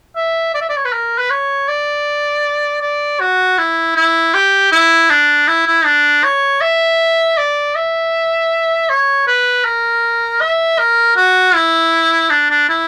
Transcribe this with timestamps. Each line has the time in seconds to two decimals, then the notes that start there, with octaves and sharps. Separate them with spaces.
0.16 E5
0.55 D5
0.62 E5
0.70 D5
0.77 C#5
0.85 B4
0.93 A#4
1.19 B4
1.30 C#5
1.69 D5
2.81 D5
3.20 F#4
3.58 E4
3.96 E4
4.34 G4
4.72 E4
5.10 D4
5.48 E4
5.67 E4
5.85 D4
6.24 C#5
6.61 E5
7.38 D5
7.76 E5
8.90 C#5
9.27 B4
9.65 A#4
10.41 E5
10.79 A#4
11.17 F#4
11.55 E4
12.31 D4
12.51 D4
12.69 E4